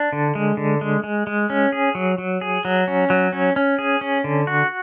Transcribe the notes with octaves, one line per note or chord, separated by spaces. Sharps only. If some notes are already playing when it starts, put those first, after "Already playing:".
Already playing: D4
D3
G#3
D3
G#3
G#3
G#3
C#4
G#4
F#3
F#3
G#4
F#3
C#4
F#3
C#4
C#4
G#4
C#4
D3
F#4